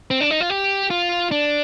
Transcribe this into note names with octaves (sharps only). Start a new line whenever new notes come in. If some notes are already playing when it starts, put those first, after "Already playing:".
C4
D4
D#4
F4
G4
F4
D4